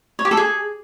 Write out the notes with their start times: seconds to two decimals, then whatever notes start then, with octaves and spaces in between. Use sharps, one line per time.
0.19 C#5
0.25 G4
0.31 A4
0.37 G#4